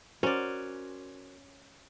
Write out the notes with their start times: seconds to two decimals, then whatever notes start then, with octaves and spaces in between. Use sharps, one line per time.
0.23 C#4 F#4 A#4 C5 D5